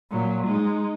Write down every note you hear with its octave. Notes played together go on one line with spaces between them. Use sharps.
A#2 F#3
G#3 D#4